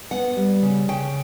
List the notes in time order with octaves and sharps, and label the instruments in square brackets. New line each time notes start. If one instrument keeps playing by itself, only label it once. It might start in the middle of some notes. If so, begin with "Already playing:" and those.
[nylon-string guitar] B3 F#5
G3
C#3
C#3 G5